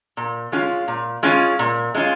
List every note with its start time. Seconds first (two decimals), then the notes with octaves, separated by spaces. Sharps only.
0.17 A#2
0.52 G#3 C#4 F4
0.88 A#2
1.23 G#3 C#4 F4
1.59 A#2
1.95 G#3 C#4 F4